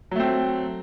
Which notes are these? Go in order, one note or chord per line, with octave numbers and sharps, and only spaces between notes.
F#3 A3 C4